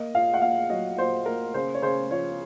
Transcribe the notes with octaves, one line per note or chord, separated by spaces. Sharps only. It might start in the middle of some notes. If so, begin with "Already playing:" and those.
Already playing: A#3 D#5
A#2 F5
F#5
A#2 F5
F#3 D#5
A#2 C5
A#3 A#4
C#3 C5
C#5
C#3 C5
F3 C#5